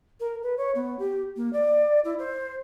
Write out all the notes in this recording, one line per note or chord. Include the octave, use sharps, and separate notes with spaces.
A#4
B4
C#5
B3
G4
A#3
D5
E4
C5